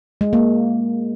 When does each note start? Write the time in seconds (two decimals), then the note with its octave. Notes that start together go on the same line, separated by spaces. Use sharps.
0.21 G#3
0.33 A#3